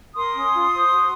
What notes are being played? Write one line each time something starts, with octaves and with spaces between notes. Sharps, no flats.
A#4 C6 D#6
C#4
F4
C5
F#4